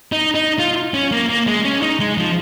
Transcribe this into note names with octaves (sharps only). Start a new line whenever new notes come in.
D#4
D#4
F4
C#4
A#3
A#3
G#3
C#4
D#4
G#3
F3